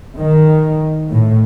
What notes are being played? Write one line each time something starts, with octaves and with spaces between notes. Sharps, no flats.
D#3
A2